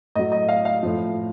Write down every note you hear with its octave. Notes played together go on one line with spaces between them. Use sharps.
A2 F#3 D#5
D#5
F5
F5
A2 F3